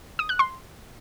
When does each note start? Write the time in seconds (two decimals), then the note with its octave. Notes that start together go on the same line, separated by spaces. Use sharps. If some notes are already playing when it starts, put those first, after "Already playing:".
0.19 D#6
0.29 F#6
0.39 C6